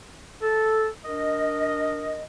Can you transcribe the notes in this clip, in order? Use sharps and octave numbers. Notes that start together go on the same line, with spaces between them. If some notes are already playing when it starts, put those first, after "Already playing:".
A4
D4 A#4 D#5